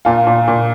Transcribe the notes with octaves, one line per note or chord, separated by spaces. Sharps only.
A#2 F4
A#2
A#2